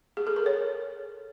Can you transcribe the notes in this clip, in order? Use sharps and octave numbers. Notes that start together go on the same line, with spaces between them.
G#4
A4
A#4
C#5